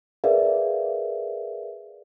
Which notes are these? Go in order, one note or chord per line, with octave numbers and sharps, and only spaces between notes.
G#4 A#4 B4 D5 E5 F5